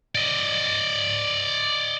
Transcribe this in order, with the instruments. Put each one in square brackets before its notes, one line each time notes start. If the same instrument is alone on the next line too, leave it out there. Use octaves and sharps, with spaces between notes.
[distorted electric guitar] D5 D#5